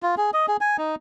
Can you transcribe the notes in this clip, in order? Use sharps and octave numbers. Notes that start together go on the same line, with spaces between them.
F4
G#4
D#5
G#4
G#5
D#4